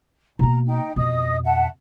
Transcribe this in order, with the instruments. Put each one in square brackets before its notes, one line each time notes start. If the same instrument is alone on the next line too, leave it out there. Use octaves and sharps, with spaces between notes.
[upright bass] B2 A#3 [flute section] A#5
[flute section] D#4 G5
[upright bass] F2 B2 [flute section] D#5 D#6
[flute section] E5 F#5 A5